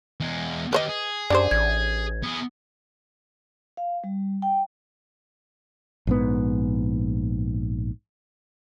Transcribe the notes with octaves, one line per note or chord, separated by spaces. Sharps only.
E2 G#3
D#3 G4 B4 C5 D#5
G#4
F#2 D4 G4 C5 D5
A1 G#6
B3 G#4
F5
G3
G5
A#1 G#2 B3